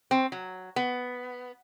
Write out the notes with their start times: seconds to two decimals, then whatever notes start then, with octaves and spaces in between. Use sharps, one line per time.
0.11 C4
0.32 F#3
0.76 B3